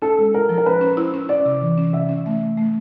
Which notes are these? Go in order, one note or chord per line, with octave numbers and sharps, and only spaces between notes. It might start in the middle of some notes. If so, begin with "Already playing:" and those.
C#4 A4
G#3
E4 A#4
F3
A#4
C#4 B4
C#4
E4 C5
C#4
C#4 D5
C3
E3
C#4
C3 E5
C#4
A3
A3
A3